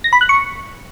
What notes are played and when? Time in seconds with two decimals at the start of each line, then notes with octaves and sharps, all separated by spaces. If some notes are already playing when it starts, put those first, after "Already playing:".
0.04 A#6
0.13 B5
0.21 F#6
0.29 C#6